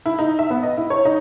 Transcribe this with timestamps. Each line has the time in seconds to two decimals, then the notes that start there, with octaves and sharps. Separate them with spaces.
0.06 E4
0.19 D#4
0.39 E5
0.50 B3
0.63 D#5
0.77 E4
0.90 C#5
1.05 D#4